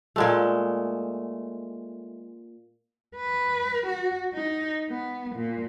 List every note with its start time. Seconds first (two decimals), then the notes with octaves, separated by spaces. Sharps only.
0.16 A#2 G#3 A3
3.16 B4
3.87 F#4
4.34 D#4
4.90 B3
5.36 A#2